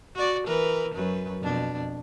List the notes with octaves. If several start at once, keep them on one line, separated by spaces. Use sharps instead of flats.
F#4 D5
E3 A#4 B4
F#2 F#3 B4
F2 B2 D4